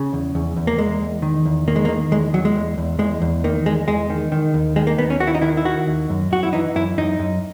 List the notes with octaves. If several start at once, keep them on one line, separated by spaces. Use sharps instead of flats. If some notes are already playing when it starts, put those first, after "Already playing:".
Already playing: C#3
E2
E2
E2
A#3
E2 G#3
E2
D#3
E2
D#3 A#3
G#3
A#3
D#3
E2 G#3
E2 F#3
G#3
E2
E2
E2 G#3
E2
D#3 A#3
E2 G#3
E2 G#3
D#3
D#3
D#2
D#3 G#3
A#3
D#2 B3
C#4
D#2 F#4
E4
D#4
D#3 E4
E4
D#3 F#4
D#2
F#2
F#2 F#4
E4
E3 D#4
F#2 E4
F#2 D#4
F#2